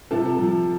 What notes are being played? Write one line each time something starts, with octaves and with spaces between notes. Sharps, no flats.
C3 F4 A4
F3